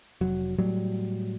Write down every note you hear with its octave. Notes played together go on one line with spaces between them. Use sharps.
F1 F#3
A2 F#3 G3